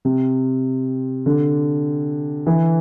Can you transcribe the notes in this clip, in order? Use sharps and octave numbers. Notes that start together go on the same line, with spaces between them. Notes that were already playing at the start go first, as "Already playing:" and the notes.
C3
D3
E3